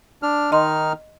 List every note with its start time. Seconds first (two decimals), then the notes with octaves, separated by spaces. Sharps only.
0.23 D4 F6
0.52 D#3 D#4 D#5 C6 F6